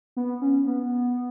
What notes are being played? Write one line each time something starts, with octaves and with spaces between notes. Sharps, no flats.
B3
C#4
B3